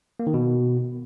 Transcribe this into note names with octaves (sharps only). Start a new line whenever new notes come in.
A#3
D#3
B2